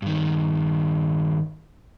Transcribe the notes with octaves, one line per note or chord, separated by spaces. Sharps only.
G2 D#3